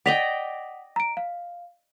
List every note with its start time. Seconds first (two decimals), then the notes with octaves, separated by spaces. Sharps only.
0.06 D5 D#5 F#5 G5 B6 F7
0.96 A#5 D7
1.17 F5